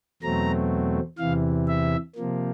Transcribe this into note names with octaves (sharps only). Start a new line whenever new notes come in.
E2 B2 F#3 A3 C4 A#5
E2 C3 E3 F5
E5
C3 F3 A#3